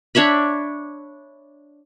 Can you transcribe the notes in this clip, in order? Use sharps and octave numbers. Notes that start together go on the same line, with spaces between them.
D4 C#5 E5 B5